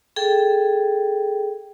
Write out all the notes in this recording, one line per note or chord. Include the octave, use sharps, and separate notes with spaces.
G#4 A4 G5